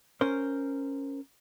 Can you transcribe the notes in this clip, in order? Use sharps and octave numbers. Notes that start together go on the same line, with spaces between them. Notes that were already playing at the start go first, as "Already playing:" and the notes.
C#4 A#4 C5